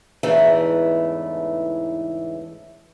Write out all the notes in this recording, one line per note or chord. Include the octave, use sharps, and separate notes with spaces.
E2 G#2 C#3 E3 A3